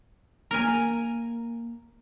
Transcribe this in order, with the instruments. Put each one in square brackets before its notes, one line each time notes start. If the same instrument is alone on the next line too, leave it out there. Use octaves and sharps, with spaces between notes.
[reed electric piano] A#3 A#5 [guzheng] A#4 G#5